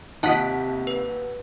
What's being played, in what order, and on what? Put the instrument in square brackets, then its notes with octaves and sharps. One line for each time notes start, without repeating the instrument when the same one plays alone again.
[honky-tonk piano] D#2 F4 B6 [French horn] C3 [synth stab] D#4 D#5 F#5 [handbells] A5
[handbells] B4